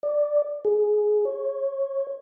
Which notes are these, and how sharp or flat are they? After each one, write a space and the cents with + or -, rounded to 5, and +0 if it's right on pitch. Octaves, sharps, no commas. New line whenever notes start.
D5 +5
G#4 +15
C#5 -20